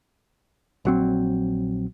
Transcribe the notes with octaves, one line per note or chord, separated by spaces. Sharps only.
A#1 F#3 C4